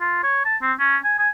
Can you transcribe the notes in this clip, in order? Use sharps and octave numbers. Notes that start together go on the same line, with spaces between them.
F4
C#5
A5
C4
C#4
G#5
G#5